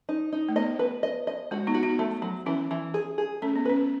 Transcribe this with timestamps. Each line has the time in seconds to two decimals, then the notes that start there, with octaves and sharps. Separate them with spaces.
0.09 D#4
0.32 D#4
0.49 A3
0.56 B3 D#5
0.79 B4
1.03 D#5
1.27 D#5
1.51 G#3 F#4
1.67 B3 D#4
1.74 F#4
1.83 B3 D#4
1.99 A3
2.22 F#3
2.46 E3 C#4 E4
2.71 E3
2.94 G#4
3.18 G#4
3.42 A3 C#4
3.56 B3
3.65 C#4 B4